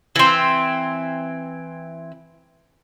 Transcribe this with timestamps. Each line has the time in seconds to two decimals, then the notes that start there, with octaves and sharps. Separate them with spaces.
0.16 E3 C4